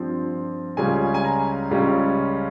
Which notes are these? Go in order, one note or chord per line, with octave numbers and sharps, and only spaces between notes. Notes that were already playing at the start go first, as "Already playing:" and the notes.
Already playing: G2 F3 C4 F4
C#2 C#3 G3 C#4 F4 G#5
G#5
A#5
C#2 C#3 G3 C#4 F4